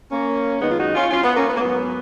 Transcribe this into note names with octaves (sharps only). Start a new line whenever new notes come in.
A#3 C#4
F#2 D#3 G#3 B3 D#4
F4
D#4 F#4
C#4 F4
C#4 F4
B3
A#3 C#4
B3
A#3
G#2 F#3 B3